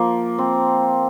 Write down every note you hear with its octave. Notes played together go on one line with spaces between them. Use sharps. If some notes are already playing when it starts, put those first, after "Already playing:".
Already playing: F3 A#3
C4